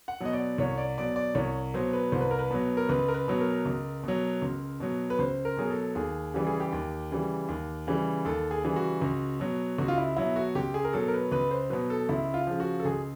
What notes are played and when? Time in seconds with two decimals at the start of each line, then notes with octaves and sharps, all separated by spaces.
0.08 F#5
0.20 B2 F#3 D#5
0.33 D5
0.58 C2 C#5
0.78 D5
0.98 B2 F#3 D5
1.16 D5
1.35 C2 C#5
1.74 B2 F#3 C5
1.93 B4
2.12 C2 C5
2.21 B4
2.31 A#4
2.39 B4
2.51 B2 F#3
2.77 A#4
2.89 C#2 B4
3.08 A#4
3.14 B4
3.28 B2 F#3
3.41 A#4
3.66 C#2
4.03 B2 F#3
4.42 C#2
4.80 B2 F#3
5.10 B4
5.19 C#2 C5
5.45 A#4
5.57 B2 F#3 G#4
5.70 A4
5.95 D#2 G#4
6.34 C#3 E3 G3 G4
6.47 G#4
6.60 G4
6.73 D#2
7.11 C#3 E3 G3
7.49 D#2
7.87 C#3 E3 G3
8.25 D#2 A4
8.51 G#4
8.63 C#3 E3 G3
8.76 F#4
9.02 C#2
9.40 B2 F#3
9.78 C#2 F#4
9.88 F4
9.98 E4
10.17 B2 F#3 E4
10.36 F#4
10.55 C#2 G4
10.74 G#4
10.84 A#4
10.93 B2 F#3 A4
11.08 A#4
11.14 B4
11.32 C#2 B4
11.51 C5
11.70 B2 F#3 B4
11.90 A4
12.09 C#2 E4
12.34 F4
12.47 C#3 F3
12.60 F#4
12.80 A4
12.85 C#2 G#4